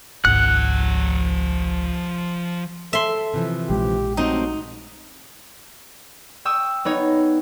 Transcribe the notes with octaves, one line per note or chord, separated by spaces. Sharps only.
G#1 C#2 F3 F#5 F#6
A4 E5 C6
C3 E3 F3
A#1 G#3 G4
F#3 A3 C4 D#4 D#5
G5 C#6 D#6 E6
B3 D#4 C#5